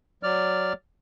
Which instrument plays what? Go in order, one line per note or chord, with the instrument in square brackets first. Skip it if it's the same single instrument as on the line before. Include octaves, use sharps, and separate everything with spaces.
[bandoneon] F#3 D5 F6